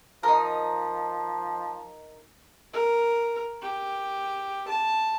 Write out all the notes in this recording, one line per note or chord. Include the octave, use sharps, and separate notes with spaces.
F3 D#4 A#4
A#4
G4
A5